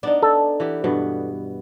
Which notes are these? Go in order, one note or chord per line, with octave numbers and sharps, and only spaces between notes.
B3 D4 D#4
A4
E3 B3 G4
G2 B2 B3